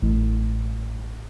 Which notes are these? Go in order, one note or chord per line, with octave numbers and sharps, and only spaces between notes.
A1 A2